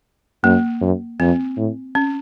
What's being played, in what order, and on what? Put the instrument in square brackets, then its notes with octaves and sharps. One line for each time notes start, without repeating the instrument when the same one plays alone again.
[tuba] F#2 [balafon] A#3
[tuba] F#2
[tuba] F2 [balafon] C4
[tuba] A2
[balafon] C#4